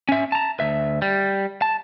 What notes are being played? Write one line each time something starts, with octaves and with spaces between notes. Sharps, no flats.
C#4 E5
A5 A#5
D2 E5
G3
A5